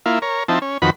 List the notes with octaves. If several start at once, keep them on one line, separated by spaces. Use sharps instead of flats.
A#3 E4 F4
A#4 C#5
F3 C4 D#4 E4 A5
C#4
F2 D#3 F#4 B4 B5